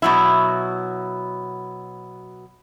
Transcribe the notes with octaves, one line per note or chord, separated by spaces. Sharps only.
B2 F#3 E4